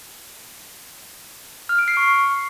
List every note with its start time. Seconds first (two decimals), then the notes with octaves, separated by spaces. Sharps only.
1.69 F6
1.79 D7
1.88 C7
1.97 C#6